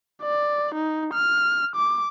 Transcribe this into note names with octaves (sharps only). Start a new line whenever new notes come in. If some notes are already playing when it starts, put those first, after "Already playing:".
D5
D#4
F6
D6